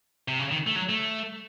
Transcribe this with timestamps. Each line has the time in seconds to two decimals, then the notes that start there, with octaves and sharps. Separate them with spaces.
0.28 C3
0.39 C#3
0.52 D#3
0.67 A3
0.76 F#3
0.89 A3